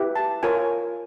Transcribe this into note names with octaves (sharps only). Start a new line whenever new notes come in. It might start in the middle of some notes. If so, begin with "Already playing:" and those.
Already playing: E4 G4 B4
A5
F4 A#4 C#5 G#5